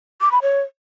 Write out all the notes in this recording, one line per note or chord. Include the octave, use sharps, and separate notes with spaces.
D6
B5
C#5